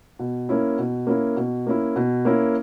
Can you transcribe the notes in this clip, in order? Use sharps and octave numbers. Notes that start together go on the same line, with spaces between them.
B2
A#3 C#4 E4
B2
A#3 C#4 E4
B2
A#3 C#4 E4
B2
A#3 C#4 E4